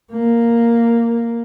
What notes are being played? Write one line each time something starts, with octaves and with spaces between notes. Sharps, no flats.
A#3